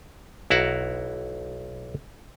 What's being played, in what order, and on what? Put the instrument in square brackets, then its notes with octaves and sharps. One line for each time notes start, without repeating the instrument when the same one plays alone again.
[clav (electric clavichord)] B1 E4 F#4 F5 F#5 A#5